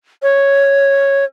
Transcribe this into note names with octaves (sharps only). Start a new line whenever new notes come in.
C#5